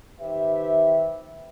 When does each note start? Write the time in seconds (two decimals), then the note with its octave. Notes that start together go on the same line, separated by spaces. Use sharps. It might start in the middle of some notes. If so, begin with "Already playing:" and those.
0.20 D#3 G4 B4 C5 E5